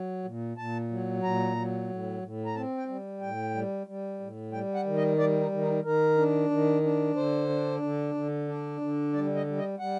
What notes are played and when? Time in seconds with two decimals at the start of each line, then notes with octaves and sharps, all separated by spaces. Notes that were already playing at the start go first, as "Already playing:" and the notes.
Already playing: F#3
0.24 A#2
0.57 A#2 A5
0.91 F#3
1.23 A#2 A#5
1.56 F#3
1.89 A2
2.23 A2
2.46 A#5
2.55 C4 A5
2.77 G5
2.88 G3
3.21 A2 G5
3.54 G3
3.87 G3
4.20 A2
4.52 G3 G5
4.75 F#5
4.86 D#3
4.97 D#5
5.19 G3 D5
5.40 D#4
5.52 D#3
5.62 D#4
5.84 D#3 A#4
6.17 D4
6.50 D#3
6.83 D4
7.16 D3 C5
7.49 D4
7.82 D3
8.15 D3
8.48 D4
8.81 D3
9.13 G3 D5
9.36 D#5
9.47 G3
9.57 D#5
9.79 G3 F#5